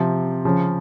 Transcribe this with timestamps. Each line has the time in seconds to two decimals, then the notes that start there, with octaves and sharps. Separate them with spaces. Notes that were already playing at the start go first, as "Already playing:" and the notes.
Already playing: C3 F3
0.45 C#3 F3